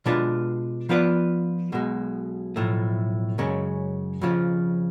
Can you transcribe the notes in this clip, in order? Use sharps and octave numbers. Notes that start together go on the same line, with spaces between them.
B2 G#3 D4 F4 B4
F3 B3 F4 B4 D5
B1 B2 G#3
B1 A2 F3 A3
F#2 C#3 G#3 C#4
F2 C#3 F3